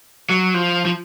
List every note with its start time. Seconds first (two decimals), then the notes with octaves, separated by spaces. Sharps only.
0.30 F#3
0.54 F3
0.86 F3